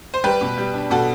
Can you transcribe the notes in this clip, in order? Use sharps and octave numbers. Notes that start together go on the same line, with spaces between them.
C5
G3 G4 B4
B2
G3
D4
B2 F#4 A4